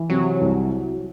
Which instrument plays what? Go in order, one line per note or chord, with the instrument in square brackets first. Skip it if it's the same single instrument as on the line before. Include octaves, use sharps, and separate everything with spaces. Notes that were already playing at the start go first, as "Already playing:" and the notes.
Already playing: [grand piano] E3
[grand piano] C3 [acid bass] F#3
[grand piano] C2